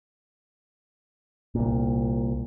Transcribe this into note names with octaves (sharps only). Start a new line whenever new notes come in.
C2 A#2